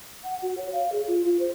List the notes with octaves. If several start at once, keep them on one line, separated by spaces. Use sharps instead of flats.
F#5
F#4
C#5
F5
G#4
F4
F4
C5